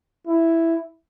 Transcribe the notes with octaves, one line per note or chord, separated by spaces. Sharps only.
E4